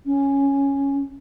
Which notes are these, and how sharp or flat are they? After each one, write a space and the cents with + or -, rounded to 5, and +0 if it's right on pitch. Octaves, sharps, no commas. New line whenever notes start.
C#4 +0